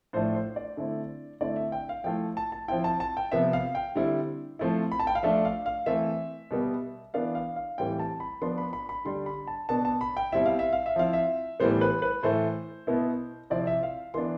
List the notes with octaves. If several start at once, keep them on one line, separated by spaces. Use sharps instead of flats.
A2 F3 A3 D4 C5
C5
D5
D3 A3 C4 E4
D3 A3 C4 E4 D5
E5
G5
F5
F3 A3 E4 G5
A5
A5
F3 C4 E4 G5
A5
A5
G5
C3 F3 B3 E5
F5
G5
D3 G3 C4 E4
F3 A3 C4 E4
B5
A5
G5
F5
F3 A3 D4 E5
F5
F5
E3 A3 C4 E4 E5
B2 G3 B3
E3 B3 D4 F5
F5
F5
A2 E3 G3 C4 E4 G5
A5
B5
F3 B3 D4 C6
B5
B5
B5
D3 G3 D4 C6
B5
A5
B2 B3 D4 A5
A5
B5
G5
B2 G3 C4 E4 E5
F5
E5
F5
E5
F3 C4 E4 F5
E5
A2 E3 G3 B3 C5
B4
B4
A2 E3 A3 C5
B2 B3 E4
C3 F3 C4 E4 D5
E5
F5
E3 B3 D4 C6